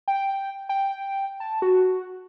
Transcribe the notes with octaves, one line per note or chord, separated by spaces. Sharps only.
G5
G5
A5
F#4